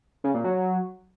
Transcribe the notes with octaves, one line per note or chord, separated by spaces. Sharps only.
C#3
A#2
F#3